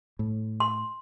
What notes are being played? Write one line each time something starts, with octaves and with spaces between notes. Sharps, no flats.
A2
C6